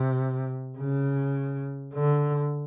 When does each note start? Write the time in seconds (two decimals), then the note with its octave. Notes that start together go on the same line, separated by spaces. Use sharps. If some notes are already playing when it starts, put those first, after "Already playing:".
Already playing: C3
0.78 C#3
1.94 D3